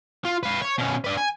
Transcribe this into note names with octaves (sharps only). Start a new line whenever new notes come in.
F4
B4 F5
C#5
B2 C#4
D4 B4
G#5